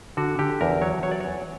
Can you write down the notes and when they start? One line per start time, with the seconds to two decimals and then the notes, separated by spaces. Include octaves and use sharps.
0.17 D3 F#4
0.39 D3 G4
0.61 E2 A#4
0.82 F#3 C#5
1.03 F#3 C#5
1.11 D5
1.20 E2 C#5